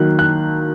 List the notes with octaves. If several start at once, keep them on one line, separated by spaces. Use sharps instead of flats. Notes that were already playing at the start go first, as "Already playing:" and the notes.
Already playing: D#3 F#3 A#3 F#6
F#6